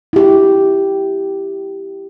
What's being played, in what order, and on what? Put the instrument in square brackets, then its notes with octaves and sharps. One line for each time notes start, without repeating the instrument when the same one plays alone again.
[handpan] E4 G4